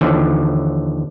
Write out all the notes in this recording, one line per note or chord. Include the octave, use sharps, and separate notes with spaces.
D#2 D3 E3 F3